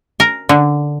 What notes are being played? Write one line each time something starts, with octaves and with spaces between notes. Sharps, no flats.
A#4
D3